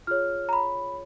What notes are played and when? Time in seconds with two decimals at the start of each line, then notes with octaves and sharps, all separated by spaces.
0.07 F4 G#4 C#5 F6
0.49 A#5
0.53 B5